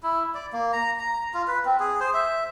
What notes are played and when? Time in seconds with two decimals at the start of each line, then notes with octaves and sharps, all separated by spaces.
0.03 E4
0.34 D5
0.53 A#3
0.73 A#5
0.99 A#5
1.34 F4
1.48 B4
1.65 C4
1.80 G#4
2.00 C5
2.14 E5